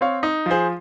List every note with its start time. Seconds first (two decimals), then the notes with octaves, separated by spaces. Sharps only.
0.01 C4 C#5 F5
0.23 D#4
0.46 F3 G#4 C5